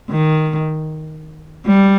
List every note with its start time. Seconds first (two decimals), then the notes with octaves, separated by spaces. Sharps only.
0.11 D#3
1.66 G3